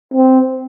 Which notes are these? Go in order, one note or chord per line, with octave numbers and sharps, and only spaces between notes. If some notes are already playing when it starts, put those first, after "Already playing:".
C4